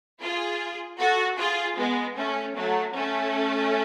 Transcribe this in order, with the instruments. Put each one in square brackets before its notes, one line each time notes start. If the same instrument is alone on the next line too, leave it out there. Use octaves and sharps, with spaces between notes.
[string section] F4 G#4
F#4 A4
F4 G#4
G#3 B3
A3 C#4
F#3 A3
A3 C#4